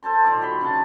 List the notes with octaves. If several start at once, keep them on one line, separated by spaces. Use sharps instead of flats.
A4 C5 A5 C6
A#2 D#3 C5 D6
F#3 B5 C6
C#3 F#5 A5